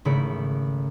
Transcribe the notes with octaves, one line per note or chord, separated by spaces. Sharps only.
G#1 C#3 A3 E4 B5 C#7